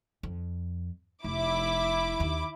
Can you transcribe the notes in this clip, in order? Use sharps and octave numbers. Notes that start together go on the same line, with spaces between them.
F2
F1 E4 D6
D#2 D#3